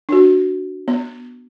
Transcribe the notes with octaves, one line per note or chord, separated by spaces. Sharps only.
D4 F#4
B3